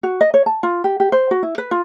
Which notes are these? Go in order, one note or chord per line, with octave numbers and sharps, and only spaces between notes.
F#4
D#5
C#5
A5
F4
G4
G4
C5
F#4
E4
B4
F4